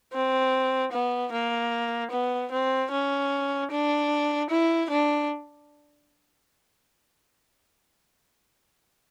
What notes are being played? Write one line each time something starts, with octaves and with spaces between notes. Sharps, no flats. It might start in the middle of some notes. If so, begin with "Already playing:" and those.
C4
B3
A#3
B3
C4
C#4
D4
E4
D4